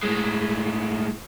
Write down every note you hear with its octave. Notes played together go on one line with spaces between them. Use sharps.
A2 G#3